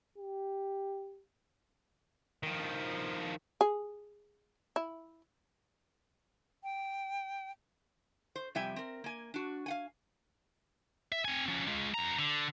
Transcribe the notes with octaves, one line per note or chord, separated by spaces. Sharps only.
G4
D#3 F3
G#4
E4
G5
C5
F2 C3 G3 E5 G5 G#5
C4 A#4
A#3 G#5
D4 F#4
F5 F#5 G#5
E5
C4 G#5
F3 C#4
G#3 F4
F2 A#5
D3